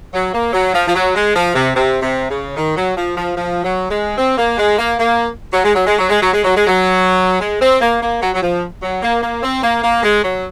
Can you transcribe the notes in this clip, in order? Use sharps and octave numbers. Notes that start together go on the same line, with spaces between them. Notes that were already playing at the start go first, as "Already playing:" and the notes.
F#3
A#3
F#3
F3
F3
F#3
G#3
F3
C3
C3
C3
C#3
D#3
F#3
F3
F3
F3
F#3
G#3
C4
A#3
G#3
A#3
A#3
F#3
G#3
F#3
G#3
F#3
G#3
F#3
G#3
F#3
G#3
F#3
G#3
C4
A#3
A#3
F#3
F#3
F3
F#3
A#3
A#3
C4
A#3
A#3
G#3
F#3